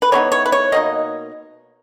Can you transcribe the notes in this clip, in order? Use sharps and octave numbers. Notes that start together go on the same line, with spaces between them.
B4
E3 G#3 B3 D#4 C#5
C#5
B4
C#5
B2 A#3 D#4 D#5